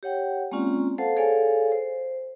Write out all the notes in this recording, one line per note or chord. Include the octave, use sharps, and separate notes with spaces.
G4 C#5 F#5 G5
G#3 A#3 C4 C#4 F4 D5
A4 C5 F5 F#5 A5
G#4 A4 C#5 D5 F5 G#5
C5